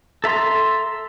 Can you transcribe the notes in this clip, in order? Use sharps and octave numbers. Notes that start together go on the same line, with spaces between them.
A4 E5 A#5 C6